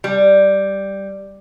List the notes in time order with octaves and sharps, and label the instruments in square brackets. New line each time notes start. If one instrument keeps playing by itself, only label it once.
[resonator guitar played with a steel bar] G3